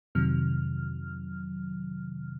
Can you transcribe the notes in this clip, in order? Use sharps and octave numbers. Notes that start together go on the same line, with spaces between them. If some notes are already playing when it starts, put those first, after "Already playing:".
F2 C3 D#3 F#3 F6